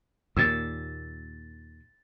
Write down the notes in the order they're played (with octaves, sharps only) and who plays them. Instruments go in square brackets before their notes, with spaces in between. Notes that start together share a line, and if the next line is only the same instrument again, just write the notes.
[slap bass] D#2 A#2 [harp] E6 G#6 A6